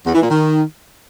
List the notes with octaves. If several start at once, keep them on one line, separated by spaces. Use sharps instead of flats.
E2
E3
A#2
D#3